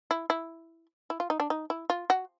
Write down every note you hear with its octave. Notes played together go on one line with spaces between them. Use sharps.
E4
E4
E4
F4
D#4
D4
D#4
E4
F4
F#4